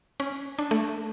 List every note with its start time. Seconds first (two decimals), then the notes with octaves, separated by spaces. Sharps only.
0.20 C#4
0.59 D4
0.71 A3